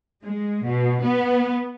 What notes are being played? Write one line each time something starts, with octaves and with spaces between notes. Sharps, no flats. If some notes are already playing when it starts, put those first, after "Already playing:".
G#3
B2
B3